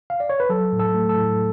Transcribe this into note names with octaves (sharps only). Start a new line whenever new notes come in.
F5
D5
C#5
B4
F#3 A4
A2
A4
A3
A4
A2